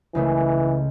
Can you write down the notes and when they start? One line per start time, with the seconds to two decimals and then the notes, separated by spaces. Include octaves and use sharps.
0.15 C#2 C#3 E3 A3